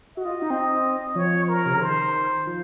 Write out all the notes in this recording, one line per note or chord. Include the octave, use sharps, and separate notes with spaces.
F#4 D#5
F4
D#4
C4
F3 C#5
A#4
C3
C#3
D#3 C5
F3